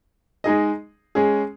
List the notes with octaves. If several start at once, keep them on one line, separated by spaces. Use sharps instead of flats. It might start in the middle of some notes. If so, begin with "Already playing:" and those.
G#3 D#4 G#4 D#5
G#3 C#4 G#4